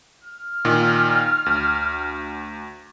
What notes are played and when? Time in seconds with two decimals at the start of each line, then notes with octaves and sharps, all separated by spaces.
0.23 F6
0.65 A#2 D#3
1.46 D2